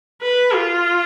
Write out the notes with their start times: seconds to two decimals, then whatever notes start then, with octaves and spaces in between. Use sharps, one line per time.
0.22 B4
0.54 F4